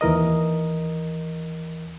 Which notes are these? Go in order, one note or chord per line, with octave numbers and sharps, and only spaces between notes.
D#2 E3 A#4 D#5